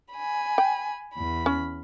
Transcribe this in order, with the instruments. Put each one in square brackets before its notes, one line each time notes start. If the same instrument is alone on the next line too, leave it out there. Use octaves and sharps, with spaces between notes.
[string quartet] G#5 B5
[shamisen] G5
[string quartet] E2 B5
[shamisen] C#4